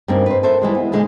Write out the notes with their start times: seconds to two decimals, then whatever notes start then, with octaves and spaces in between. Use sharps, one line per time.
0.08 G2 C#3 A#3 C4 D#4
0.26 B4 C5
0.43 A4 A#4 C5 E5
0.62 E3 G3 G#3
0.75 B3
0.92 A#2 D3 G#3 D#4 D5 D#5